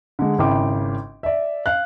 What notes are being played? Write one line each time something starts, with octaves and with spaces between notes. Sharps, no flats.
D3 G#3
G#1 C#3 E4 G5 D6
D5 E5
F5 F#6